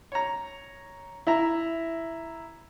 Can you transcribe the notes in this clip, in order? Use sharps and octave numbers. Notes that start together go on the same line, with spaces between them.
C#5 A#5
E4 E5 A#5